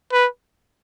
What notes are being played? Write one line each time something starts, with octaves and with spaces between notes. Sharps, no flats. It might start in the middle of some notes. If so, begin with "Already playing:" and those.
B4